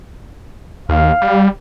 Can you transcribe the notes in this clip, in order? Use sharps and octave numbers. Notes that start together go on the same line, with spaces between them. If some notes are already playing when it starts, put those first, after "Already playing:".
D#2 F5
G3